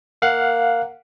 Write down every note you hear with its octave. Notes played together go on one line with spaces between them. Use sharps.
A#3 F5 F#5 F#6